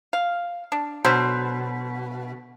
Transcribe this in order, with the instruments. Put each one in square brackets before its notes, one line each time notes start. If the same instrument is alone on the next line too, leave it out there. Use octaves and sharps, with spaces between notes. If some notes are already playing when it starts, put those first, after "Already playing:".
[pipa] F5
D4
[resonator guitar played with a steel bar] B2 [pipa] D3 F#3 C5